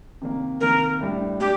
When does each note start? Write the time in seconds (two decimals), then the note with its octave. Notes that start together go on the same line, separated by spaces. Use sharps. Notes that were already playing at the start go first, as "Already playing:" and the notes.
0.21 C3 D#3 A#3
0.61 C3 D#3 A#3 A#4
1.01 A2 G3 D4
1.40 G3 D4 G4